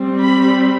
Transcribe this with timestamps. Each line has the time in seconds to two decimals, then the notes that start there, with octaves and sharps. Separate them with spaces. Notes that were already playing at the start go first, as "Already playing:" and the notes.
Already playing: G3 C4
0.21 B5